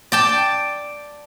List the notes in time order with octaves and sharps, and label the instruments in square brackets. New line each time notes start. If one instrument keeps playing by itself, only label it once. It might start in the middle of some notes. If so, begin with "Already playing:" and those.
[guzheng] D5 G5 A5